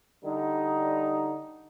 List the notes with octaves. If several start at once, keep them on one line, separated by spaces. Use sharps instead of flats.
D3 G3 D#4